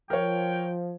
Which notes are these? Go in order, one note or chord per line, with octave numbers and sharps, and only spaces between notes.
F3 A#4 C#5 G5